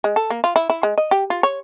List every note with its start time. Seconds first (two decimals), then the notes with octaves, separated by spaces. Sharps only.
0.04 G#3
0.16 A4
0.30 A#3
0.44 F4
0.56 E4
0.70 E4
0.83 G#3
0.98 D#5
1.11 G4
1.30 F4
1.43 C#5